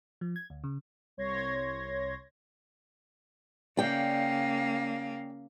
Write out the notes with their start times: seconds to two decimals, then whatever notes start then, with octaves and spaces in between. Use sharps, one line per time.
0.21 F3
0.36 G#6
0.50 D2
0.64 C#3
1.17 C2 C#5 C6 G#6 A#6
3.77 C#3 A#3 D5 G5